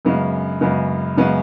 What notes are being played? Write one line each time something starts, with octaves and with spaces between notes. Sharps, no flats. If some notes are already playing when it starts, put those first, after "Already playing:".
F#2 C#3 G#3 B3
F#2 C#3 G#3 B3
F#2 C#3 G#3 B3